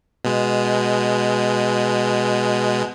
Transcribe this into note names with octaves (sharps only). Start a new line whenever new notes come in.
B2 G#3